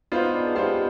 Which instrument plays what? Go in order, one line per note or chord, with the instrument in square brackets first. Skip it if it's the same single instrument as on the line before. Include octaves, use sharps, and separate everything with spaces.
[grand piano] B3 F4 C5 [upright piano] D#4
[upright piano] D#4
D4
G#4
[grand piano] B3 F4 C5 [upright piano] G4